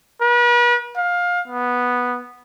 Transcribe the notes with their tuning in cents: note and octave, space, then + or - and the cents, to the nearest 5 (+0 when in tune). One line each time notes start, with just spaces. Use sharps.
B4 -40
F5 +20
B3 -5